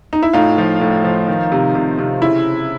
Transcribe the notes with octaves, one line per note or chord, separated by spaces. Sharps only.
D#4
E4
A2 D#4 F4
F3
A2
F3
D#3
C3
C3
C3
C#3 E4